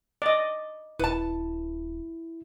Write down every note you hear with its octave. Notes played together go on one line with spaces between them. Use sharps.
D5 D#5
D#1 E4 B4 A5